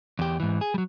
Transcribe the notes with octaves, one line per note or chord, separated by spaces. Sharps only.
E2 G4
G#2 E3
G#4
F#3 G3